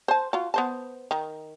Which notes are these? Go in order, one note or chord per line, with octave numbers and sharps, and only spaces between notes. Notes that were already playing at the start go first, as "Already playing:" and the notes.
C5 A5
F4 F#4
B3 C5 A5
D#3